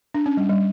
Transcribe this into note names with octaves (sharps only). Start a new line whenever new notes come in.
D4
C#4
G3
G3